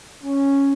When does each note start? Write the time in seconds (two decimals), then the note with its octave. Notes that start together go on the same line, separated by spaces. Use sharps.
0.24 C#4